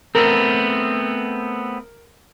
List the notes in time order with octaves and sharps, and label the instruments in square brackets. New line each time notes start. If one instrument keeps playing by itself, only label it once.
[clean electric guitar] A3 B3 C4 [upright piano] A#4